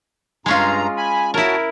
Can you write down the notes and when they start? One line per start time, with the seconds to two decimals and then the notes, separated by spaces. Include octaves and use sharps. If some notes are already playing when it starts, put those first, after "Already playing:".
0.46 G2 G#3 C#4 F4 A#5
0.97 G#5 B5
1.34 E4 F#4 A#4 C#5 A5